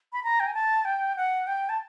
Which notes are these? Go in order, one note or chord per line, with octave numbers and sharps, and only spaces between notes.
B5
A#5
G5
G#5
A5
G5
F#5
G5
A5